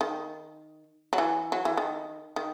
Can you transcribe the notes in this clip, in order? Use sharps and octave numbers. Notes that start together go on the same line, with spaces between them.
D#3
F#3
E3
F#3
E3
D#3
D#3